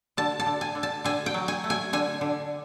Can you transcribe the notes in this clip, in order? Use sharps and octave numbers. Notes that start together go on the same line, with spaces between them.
D3 A5
A5
D3
G#5
D3
A5
D3 G#5
G5
F#3
G#5
A3
G#5
D3 G#5
D3